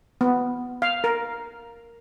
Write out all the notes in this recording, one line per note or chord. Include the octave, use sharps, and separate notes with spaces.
B3
F5
A#4